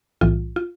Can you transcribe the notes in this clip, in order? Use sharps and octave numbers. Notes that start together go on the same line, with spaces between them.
B1 A2 E3 G3 F4
F4